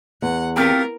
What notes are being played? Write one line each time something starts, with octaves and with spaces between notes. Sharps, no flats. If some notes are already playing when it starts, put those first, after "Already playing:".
E2 F#5
A3 C4 F4 G4 A#4